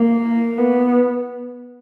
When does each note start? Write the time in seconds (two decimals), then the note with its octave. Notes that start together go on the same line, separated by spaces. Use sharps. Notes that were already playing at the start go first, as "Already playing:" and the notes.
Already playing: A#3
0.58 B3